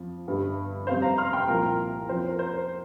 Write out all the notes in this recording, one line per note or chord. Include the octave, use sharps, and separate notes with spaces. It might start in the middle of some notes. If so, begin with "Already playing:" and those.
Already playing: F2 F3
G1 G2 D3 G3
G1 F2 C3 G3 C5 F5
F5 A#5
C6 F6
G5 C6
C2 A#2 F3 A#4
F2 F3 C5
A#4
C5